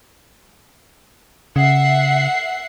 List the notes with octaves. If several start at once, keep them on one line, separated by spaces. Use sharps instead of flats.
C#3 E5 F#5 C7